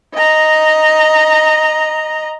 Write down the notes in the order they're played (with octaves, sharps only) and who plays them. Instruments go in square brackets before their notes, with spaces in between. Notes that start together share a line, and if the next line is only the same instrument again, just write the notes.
[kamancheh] D#5 A#5